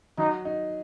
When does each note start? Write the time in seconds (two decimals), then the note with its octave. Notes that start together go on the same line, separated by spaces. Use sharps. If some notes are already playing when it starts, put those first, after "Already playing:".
0.18 F#3 D#4
0.45 D#4